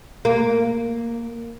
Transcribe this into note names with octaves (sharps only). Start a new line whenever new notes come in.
A#3